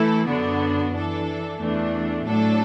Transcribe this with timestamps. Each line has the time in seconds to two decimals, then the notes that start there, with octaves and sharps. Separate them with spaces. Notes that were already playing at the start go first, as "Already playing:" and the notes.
Already playing: E3 A3 E4 A4
0.26 F#2 D3 B3 D4 F#4
0.92 E3 D4 A4
1.59 E2 E3 A3 D4
2.26 A2 F#3 D4 A4